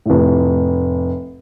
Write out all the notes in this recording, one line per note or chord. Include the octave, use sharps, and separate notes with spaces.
F1 A2